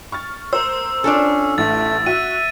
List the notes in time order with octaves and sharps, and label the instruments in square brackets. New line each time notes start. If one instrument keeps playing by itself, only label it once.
[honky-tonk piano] C#6 F6 A6
[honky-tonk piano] A#4 C5 [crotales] E6
[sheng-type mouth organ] C#4 [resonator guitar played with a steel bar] D4 F4 A4
[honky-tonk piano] A1 [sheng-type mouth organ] A3 [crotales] A6
[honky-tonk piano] F#4 [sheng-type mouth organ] E5 [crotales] D#7